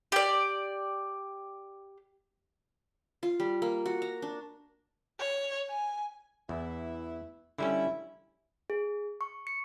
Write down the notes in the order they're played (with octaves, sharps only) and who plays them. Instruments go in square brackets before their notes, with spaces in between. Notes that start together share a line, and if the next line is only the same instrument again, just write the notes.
[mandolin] G4 D5
[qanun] F4
G3
A#3
F#4
A#5
D4
[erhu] C#5
G#5
[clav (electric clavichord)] E2 [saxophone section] E3 E4
[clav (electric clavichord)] D3 G3 C#4 [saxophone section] E4
[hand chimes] G#4
C#6
C#7